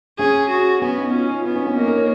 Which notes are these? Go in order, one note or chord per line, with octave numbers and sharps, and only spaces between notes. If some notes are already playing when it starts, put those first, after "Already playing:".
C#4 G#4
F#4
B3 C#4
D#4
C#4 F4
F4
B3 D#4
C#4
C#4
A#3 D#4
A#4
C#5